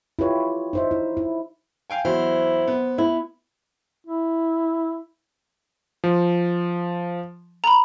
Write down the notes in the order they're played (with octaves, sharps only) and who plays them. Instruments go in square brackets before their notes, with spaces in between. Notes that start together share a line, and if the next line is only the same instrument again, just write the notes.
[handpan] E4 F4 G4 B4 C#5
D#4 C5 E5
E4
E4
[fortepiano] F5 G5 G#5
[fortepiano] E2 F#3 [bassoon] E4 [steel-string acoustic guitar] C5
[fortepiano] B3
[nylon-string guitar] E4
[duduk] E4
[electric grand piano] F3
[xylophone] A#5 B5